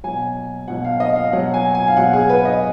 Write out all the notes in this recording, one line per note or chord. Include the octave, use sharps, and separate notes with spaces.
B2 F#3 G#5
B2 F#3 F#5
F5
D#5
F5
B2 F#3 F#5
G#5
G#5
F5
B2 F#3 F#5
G#4
B4
D#5